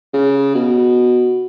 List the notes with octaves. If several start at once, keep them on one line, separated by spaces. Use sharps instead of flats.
C#3
B2